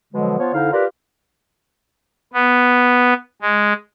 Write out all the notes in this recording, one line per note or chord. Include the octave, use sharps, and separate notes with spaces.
B2 D3 F3 F#3 G#3
F3 B3 F4 C#5
F2 D3 D#4 E4 F5
F4 G4 A#4 B4 D5
B3
G#3